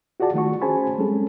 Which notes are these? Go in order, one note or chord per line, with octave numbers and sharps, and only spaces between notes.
F4 F#4 G#4 D5 A5
D#3 A3 F#4 C#6
C#4 G#4 C5 G#5 A5 B5
G3 G#3 C4 C#4 G#4 A4